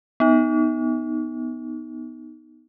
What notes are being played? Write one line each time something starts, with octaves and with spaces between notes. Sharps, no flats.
B3 D#4